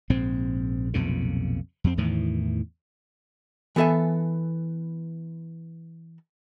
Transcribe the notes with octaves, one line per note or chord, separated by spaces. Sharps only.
A#1 G#2 C4
B1 F2 A#2 C#3
F2 C4
E2 A2 D#3 E3
E3 B3 A4 E5 G#5